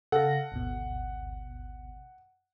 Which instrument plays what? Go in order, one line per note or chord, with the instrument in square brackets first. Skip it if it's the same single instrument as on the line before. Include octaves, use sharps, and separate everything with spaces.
[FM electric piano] C#3 F5 A#6 [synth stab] A4 [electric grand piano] F#5
[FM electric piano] G#1 D2 B2